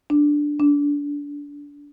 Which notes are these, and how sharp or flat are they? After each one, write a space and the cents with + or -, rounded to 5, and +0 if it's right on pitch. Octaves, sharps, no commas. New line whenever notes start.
D4 +0
D4 -25